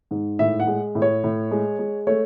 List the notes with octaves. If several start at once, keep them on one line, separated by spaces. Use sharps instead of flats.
G#2
A2 E5
F#5
G#3
A2
C#5
A2
G#3
G#3
A3 C#5